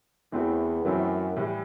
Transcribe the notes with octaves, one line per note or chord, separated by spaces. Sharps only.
E2 E3 A3 C4 F#4
F#2 E3 A3 C4 E4
A2 E3 G3